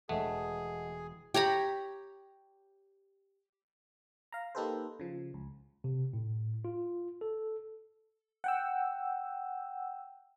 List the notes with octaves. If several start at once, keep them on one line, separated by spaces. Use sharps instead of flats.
E1 G#3 A3 G#4 D#5 F#5
G4 C#5 A#5 B5
F5 A#5
A#3 D#4 G4 A4 B4 C5
C#3 F3
C#2
C3
A2
F4
A4
F#5 G5 E6